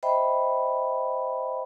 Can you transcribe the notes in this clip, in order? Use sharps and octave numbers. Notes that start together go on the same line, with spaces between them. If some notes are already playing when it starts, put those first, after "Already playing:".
C5 D#5 E5 G5 B5